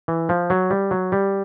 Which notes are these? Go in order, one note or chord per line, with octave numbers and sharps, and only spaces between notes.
E3
F3
F#3
G3
F#3
G3